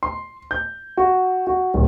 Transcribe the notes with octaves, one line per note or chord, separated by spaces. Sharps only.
C6
G6
F#4
F#4
D1